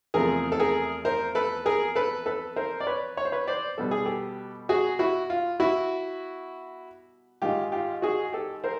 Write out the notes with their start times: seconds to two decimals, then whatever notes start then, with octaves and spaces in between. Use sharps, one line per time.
0.14 E2 C3 F3 A3 G#4 A#4
0.52 A4
0.59 G#4 A#4
1.05 A#4 C5
1.35 A4 B4
1.66 G#4 A#4
1.95 A4 B4
2.26 A4 B4
2.56 A#4 C5
2.80 D5
2.87 B4 C#5
3.17 C#5
3.25 C5
3.32 B4 C#5
3.47 C5 D5
3.78 B2 G3 B3 A4
3.91 G#4
4.05 G4 A4
4.69 F#4 G#4
4.99 E4 F#4
5.30 F4
5.60 E4 F#4
7.42 G#2 D#3 G#3 F4 G4
7.72 F4 G4
8.02 F#4 G#4
8.33 G4 A4
8.64 A#4 C5